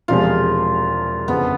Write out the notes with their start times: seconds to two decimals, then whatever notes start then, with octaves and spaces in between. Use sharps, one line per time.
0.08 E1 E2 C3 F3 G#3 F4
1.28 G1 F2 C#3 B3